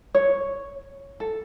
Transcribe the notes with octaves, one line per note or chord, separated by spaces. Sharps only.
C#5
A4